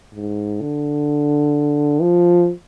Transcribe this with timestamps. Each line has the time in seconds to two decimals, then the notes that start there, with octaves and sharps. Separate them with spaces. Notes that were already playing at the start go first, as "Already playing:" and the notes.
0.14 G#2
0.61 D3
2.01 F3